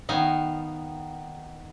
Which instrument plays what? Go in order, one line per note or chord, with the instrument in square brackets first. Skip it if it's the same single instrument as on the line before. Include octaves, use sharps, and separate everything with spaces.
[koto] D#3 B3 D#4 F5 G#5